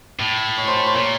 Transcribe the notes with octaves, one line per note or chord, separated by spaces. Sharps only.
A2
C#5 C#6
C5 C6
C#5 C#6
C5 C6
A#2 C#5 C#6